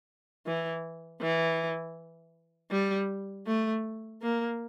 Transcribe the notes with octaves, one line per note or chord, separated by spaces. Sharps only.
E3
E3
G3
A3
A#3